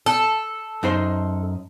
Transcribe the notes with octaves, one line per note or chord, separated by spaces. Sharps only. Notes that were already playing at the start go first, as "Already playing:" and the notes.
A4
F#2 D#4 C5